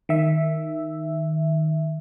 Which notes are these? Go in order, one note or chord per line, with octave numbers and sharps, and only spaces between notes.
D#3 E5